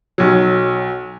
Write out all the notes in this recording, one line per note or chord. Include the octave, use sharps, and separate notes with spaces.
B1 F#3